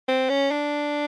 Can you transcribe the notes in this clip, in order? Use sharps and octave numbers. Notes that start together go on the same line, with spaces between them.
C4
C#4
D4